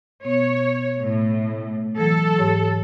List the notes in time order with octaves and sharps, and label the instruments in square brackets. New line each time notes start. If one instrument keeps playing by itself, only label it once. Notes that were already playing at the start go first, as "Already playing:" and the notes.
[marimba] B2 B3 [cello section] C#5
[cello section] A2
[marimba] E3 F#3 [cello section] A4
[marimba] G#2 G4 C#5